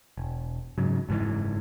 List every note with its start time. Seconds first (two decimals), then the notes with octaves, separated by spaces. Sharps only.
0.18 E1
0.78 G#2 C#3 F#3
1.09 F#1 G#2 B2 E3